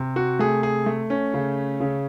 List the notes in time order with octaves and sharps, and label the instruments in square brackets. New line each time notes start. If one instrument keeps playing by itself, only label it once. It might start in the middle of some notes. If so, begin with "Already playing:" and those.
Already playing: [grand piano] C3
F#4
A3 G#4
G#4
A3
C#4
C#3
C#3